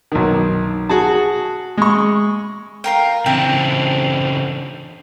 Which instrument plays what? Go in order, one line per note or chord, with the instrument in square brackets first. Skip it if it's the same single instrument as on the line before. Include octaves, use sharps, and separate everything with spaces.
[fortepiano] B1 D#3
F#4 G#4 A5
G#3 C#6
[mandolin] F4 A#4 G5
[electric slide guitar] C#3 E3 D4 [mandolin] C4 E5 A5